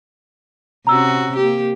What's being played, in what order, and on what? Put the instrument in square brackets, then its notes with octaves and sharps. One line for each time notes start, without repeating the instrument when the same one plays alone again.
[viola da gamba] C3 C#4 F#4 [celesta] A#5 E6
[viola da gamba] A#3 G4